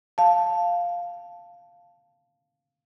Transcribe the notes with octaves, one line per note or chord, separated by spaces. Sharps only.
F5 A5